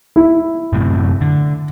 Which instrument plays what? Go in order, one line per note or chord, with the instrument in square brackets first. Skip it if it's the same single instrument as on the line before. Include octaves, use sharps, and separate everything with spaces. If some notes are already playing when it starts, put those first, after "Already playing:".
[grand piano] E4
[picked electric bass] F#2 A2 C3
D3